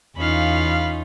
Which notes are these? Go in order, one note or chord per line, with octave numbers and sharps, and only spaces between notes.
E2 C#4 D#4 F4 F5 B5